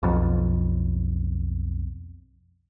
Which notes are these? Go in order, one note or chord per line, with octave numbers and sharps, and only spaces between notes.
B1 F2